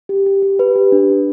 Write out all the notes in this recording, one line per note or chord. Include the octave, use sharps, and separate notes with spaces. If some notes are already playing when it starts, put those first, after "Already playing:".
G4
G4
G4
B4
G4
D4
D4